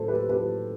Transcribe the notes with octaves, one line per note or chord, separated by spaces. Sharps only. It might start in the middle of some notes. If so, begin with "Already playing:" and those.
Already playing: A2 F#3 A4 C5
G4 B4
A2 F#3 G4 B4